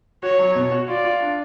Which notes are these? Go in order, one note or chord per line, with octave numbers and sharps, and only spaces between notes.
F#4 C#5
F#3
B2
F#4
F4 D5
F4
D4